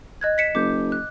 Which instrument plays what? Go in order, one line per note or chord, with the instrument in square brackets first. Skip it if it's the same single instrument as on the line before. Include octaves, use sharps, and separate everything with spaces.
[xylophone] D#5 F#6 G#6
B6 C#7 E7
[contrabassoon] F#1 [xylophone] D6 G6
[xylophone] F#6